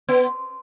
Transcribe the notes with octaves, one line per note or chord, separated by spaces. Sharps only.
B3